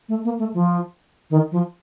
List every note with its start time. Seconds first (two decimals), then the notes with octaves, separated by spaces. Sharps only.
0.09 A3
0.24 A#3
0.39 A3
0.54 F3
1.30 D#3
1.51 F3